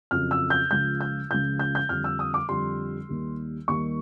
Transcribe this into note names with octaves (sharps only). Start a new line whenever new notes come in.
F2 C#3 F#3 F6
E6
G6
C#2 C#3 F3 G6
G6
C#2 C#3 F3 G6
G6
G6
F2 D3 G3 F6
E6
D#6
D6
F2 D3 G3 C6
D#2 D#3 G3
D#2 D#3 G3 C#6